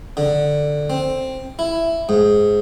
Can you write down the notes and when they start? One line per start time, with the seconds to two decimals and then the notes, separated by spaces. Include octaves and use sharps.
0.17 D3
0.90 C4
1.59 E4
2.09 G#2